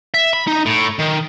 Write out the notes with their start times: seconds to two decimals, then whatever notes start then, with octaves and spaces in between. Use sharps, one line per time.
0.14 E5
0.33 B5
0.47 D#4
0.66 A2
1.00 D#3